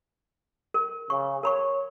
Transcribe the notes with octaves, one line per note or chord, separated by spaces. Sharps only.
A#4
C#3 C#6
A#4 C#5 B5 C#6